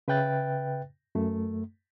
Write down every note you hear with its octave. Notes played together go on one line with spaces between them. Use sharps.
C#3 B4 E5 G5 F#6 A6
F#2 A3